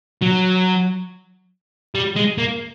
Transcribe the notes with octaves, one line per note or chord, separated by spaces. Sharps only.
F#3
G3
G#3
A#3